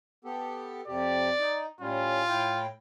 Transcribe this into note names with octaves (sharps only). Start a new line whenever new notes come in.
B3 G4 A4
F2 C3 G4 D5
D#4
A2 G3 C#4 F4
A2 E4 G5